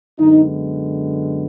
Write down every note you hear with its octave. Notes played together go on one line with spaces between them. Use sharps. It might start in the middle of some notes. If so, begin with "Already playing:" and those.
F#2 D3 G#3 B3 D#4